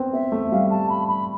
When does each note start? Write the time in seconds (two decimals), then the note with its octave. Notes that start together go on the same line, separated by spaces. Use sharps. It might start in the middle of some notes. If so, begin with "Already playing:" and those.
Already playing: B3 C4
0.13 B3 E5
0.32 A3
0.52 G3 F5
0.70 A5
0.90 B5
1.08 B5